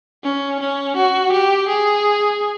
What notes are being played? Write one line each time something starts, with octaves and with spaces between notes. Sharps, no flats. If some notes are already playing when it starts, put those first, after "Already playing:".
C#4
C#4
F#4
G4
G#4